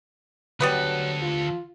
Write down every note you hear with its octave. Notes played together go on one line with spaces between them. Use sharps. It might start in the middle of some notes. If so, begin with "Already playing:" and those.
D2 F#3 G3 B3 A4 B4
F4